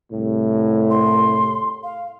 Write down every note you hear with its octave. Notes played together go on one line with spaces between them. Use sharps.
C2 A2
C6
F5